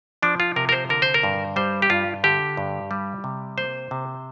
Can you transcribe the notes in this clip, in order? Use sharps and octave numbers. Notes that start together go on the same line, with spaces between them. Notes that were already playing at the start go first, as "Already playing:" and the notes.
F3 D4
F4
C3 A#4
A#4
C5
D3 A#4
C5
A#4
G2
G3 C5
G4
G2 F4
D3 G4
G2
G3
C3
A#3 C5
C3